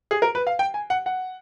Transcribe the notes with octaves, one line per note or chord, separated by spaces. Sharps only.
G#4
A#4
B4
F5
G5
G#5
F#5
F#5